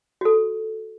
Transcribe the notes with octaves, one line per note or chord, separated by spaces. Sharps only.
F#4 A4